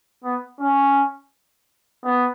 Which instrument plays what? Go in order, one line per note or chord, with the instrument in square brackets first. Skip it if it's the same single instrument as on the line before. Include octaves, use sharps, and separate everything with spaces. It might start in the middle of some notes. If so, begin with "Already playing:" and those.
[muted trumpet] B3
C#4
B3